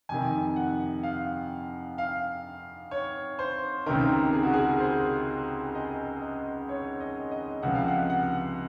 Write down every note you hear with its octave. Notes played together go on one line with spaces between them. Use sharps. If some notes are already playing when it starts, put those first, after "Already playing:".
F2 C3 D#3 G#5
F#5
F5
F5
C#5
C5
C#2 C3 D#3 A#4
G#4
F#4
G#4
C5
D#5
D#5
C#5
D#5
D#5
C#2 C3 F3 F#5
F5
F#5
F#5